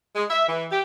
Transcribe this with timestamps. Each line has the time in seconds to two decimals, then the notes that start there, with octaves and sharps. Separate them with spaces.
0.16 G#3
0.30 E5
0.48 E3
0.71 G4